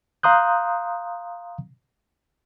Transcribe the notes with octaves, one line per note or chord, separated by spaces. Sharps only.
F5 A#5 C6 D#6 F#6 G6